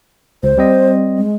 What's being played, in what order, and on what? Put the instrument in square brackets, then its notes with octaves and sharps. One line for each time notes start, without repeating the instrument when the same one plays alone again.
[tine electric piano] C#2 [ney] C5
[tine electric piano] G3 C4 D#5
[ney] G#3